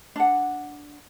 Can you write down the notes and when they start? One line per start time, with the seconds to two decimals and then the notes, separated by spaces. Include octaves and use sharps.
0.16 D4 F#5